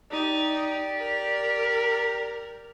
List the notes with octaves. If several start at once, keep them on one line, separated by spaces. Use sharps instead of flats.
D#4 G4 D5
A#4